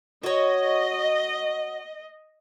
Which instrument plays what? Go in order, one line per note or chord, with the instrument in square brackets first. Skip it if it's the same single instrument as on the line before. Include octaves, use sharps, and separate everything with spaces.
[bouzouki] F#4 C#5 [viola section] D#5